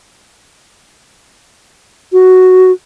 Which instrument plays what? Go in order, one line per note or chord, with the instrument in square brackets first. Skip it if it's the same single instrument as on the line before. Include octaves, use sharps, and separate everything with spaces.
[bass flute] F#4